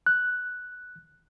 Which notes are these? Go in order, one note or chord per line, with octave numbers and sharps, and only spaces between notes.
F#6